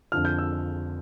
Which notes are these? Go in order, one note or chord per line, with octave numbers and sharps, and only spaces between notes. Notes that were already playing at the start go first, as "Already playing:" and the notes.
F2 D3 F3 F6
G6
E6